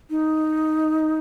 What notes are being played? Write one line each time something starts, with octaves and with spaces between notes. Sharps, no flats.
D#4